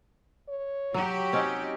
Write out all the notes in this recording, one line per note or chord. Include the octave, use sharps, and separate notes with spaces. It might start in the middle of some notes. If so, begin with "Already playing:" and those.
C#5
F#3 F#4 G4
C4 C#4 D#4 D#5